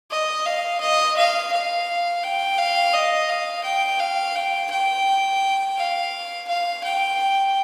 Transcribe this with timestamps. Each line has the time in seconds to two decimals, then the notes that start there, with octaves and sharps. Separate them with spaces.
0.11 D#5
0.46 F5
0.80 D#5
1.17 F5
1.52 F5
2.23 G5
2.58 F5
2.93 D#5
3.29 F5
3.64 G5
4.00 F5
4.35 G5
4.71 G5
5.77 F5
6.48 F5
6.84 G5